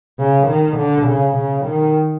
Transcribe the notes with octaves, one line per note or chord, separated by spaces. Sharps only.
C#3
D#3
D3
C#3
C#3
D#3